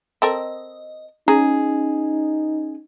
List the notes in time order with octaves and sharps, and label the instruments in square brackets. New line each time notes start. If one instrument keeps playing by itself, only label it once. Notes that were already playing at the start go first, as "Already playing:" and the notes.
[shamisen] C4 A4 A#4 [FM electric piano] D#5
[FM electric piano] C#4 [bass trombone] D#4 [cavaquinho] G#4 [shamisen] A#5